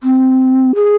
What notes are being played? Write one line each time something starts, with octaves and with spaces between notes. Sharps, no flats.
C4
G#4